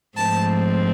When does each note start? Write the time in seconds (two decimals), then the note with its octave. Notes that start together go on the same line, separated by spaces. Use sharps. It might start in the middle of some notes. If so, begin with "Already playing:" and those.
0.17 G#2 F3 A3 C4 A5